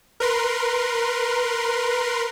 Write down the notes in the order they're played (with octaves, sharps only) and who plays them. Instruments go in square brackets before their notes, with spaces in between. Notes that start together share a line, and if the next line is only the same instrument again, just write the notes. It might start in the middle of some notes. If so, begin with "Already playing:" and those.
[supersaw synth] A#4 B4 C6